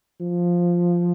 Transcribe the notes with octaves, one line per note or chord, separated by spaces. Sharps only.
F3